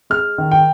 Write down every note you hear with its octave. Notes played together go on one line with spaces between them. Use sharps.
G#3 F6
D#3
G5